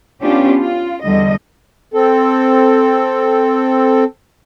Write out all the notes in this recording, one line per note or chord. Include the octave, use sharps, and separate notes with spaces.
B3 C#4 D4 F4 G4
F4
E2 D3 G3 D#5
C4 A4